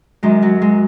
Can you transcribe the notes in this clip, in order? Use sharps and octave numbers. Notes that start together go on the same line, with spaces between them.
F#2 D#3 G#3
F#3
G#3